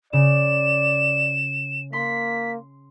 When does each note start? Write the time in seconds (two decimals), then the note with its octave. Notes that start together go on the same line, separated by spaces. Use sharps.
0.13 C#3 D5 E7
1.93 A#3 C6 B6